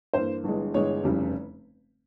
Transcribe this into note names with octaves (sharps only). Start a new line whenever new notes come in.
G2 E3 A#3 C5
G1 G2 E3 G#3
G1 G2 E3 G#3 C#5
F1 E2 C#3 G3